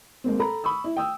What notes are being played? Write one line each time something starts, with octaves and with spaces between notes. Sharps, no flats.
G#3 A#3 C4
A4 A#5 B5
B5 C#6 D#6 E6
E4
G5 D#6 E6